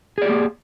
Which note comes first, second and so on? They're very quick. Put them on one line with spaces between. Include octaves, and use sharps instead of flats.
G#4 D5 G4 A#3